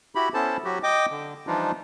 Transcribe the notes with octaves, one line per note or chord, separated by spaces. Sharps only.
E4 F#4 G4 B5
B3 C#4 E4 A4 C5 A5
F#3 F#4 G4
D#5 G5 D6
D3
E3 F3 G3 D4 D#4 F4